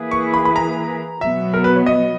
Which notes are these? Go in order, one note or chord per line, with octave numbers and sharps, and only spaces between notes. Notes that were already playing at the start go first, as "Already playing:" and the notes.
Already playing: E3 A#3 E4 G#4 B4
C#6
B5
B5
A#5
B2 F#3 B3 E5
A#4
B4
C#5
D#5